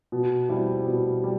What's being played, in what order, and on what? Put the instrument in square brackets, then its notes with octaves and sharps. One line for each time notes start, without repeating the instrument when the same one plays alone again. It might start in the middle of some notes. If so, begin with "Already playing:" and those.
[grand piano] B2
G3 C4 E4
B2
G3